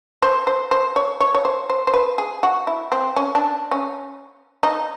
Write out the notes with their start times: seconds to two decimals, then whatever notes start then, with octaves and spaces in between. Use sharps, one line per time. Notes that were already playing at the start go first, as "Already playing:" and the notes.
0.22 C5
0.47 C5
0.71 C5
0.96 C#5
1.20 C#5
1.35 C#5
1.45 C5
1.70 C5
1.87 C5
1.94 B4
2.18 G#4
2.43 F#4
2.67 E4
2.92 C4
3.16 C#4
3.35 D4
3.71 C#4
4.63 D#4